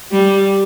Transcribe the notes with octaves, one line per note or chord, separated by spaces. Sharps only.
G3